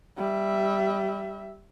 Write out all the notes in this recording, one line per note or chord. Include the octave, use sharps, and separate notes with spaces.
G3 E5